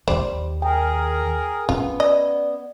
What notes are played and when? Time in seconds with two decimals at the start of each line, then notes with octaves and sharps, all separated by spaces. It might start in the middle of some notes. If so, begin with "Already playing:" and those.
0.08 D#2 D#3 G3 C5 D5
0.62 G#4 A#4 G5
1.69 B3 C#4 F4
2.00 D5 D#5